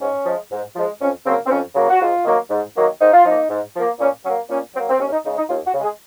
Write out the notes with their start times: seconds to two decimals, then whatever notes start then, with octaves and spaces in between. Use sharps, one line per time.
0.01 G#2 C#4
0.26 F3 G#3
0.51 G#2
0.76 F3 G#3
1.01 F2 C#4
1.26 C#3 F#3 A#3 C4
1.46 C4
1.51 F2 C#4
1.75 C#3 F#3 A#3
1.90 F#4
2.00 G#2 F4
2.25 D#3 F#3 A#3
2.51 G#2
2.76 D#3 F#3 A#3
3.00 G#2 D#4
3.13 F4
3.25 F3 A#3 D#4
3.50 G#2
3.76 F3 A#3
4.00 A#2 C#4
4.25 F#3 A#3 C#4
4.50 A#2 C#4
4.74 F#3 A#3 C4
4.89 C4
4.99 D#2 C#4
5.12 D#4
5.25 C#3 G#3 D#4
5.38 D#4
5.49 D#2 F4
5.67 F#4
5.74 C#3
5.80 G#3 G#4